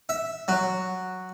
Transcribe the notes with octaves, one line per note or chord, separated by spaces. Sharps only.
E5
F#3